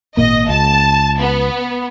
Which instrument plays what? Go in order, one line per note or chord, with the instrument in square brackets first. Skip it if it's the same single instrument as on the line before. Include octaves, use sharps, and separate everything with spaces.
[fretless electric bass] G#1 A#2 A#3 [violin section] D#5
[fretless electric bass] C#2 [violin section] A5
[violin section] B3